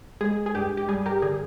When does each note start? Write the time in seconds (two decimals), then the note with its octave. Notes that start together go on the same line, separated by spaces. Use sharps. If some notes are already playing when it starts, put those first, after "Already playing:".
0.21 G#3 G#4
0.46 G#4
0.55 G2 G4
0.77 G4
0.88 G3 G#4
1.06 G4 A#4
1.22 D3 G#4